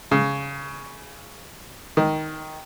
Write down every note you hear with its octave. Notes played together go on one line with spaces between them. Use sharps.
C#3
D#3